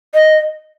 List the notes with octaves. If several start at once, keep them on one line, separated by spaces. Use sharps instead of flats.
D#5